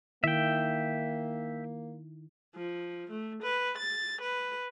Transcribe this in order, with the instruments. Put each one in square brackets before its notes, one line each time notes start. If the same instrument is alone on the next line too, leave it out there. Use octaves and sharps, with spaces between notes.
[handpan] D#3 E4 [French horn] A#3 [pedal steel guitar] E5 G5
[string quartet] F3
A3
B4
A6
B4